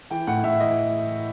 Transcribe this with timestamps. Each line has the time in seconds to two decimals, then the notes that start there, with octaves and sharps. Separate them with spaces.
0.10 E3 G5
0.27 A2 F#5
0.44 A2 E5
0.60 E3 D#5